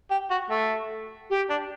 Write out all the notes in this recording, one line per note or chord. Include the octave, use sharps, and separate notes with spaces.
G4
F#4
A3
G4
D4